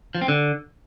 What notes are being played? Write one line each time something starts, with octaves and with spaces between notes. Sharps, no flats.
F3
C4
D3